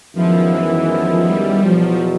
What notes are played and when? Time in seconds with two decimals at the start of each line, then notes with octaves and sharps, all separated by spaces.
0.14 F#2 D#3 F3 G#3 B3 E4
0.51 E3
0.88 F3
1.25 G3
1.63 E2 B2 F3 F#3